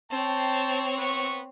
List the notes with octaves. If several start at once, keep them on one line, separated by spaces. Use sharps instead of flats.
C4 C#5 G5 A5
B3 B4 C#6